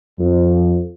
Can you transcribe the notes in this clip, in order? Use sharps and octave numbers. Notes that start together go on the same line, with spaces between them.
F2